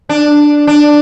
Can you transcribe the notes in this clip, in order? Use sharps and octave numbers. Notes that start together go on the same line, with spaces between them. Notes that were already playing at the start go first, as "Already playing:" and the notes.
D4
D4